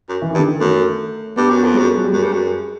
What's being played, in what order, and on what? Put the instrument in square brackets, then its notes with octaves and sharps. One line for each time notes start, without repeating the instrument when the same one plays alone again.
[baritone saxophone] F#2
[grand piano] E3
D#3
[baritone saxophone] G2
[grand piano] D3
D#3
[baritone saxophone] F#2 [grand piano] A3
[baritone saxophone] G2 [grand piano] B3
[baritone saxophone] F#2
F2
[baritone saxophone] F#2 [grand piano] G#3
[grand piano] F#3
G3
[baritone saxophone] F#2 [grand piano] G#3
[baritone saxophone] G2
F#2